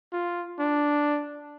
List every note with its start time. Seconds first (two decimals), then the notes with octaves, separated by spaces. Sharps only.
0.13 F4
0.59 D4